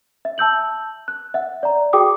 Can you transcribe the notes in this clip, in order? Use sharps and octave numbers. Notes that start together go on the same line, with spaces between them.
E5
A5 E6 G6 F#7
F#6
E5 F#5
D5 A#5
F#4 G#4 G5 D6 D#6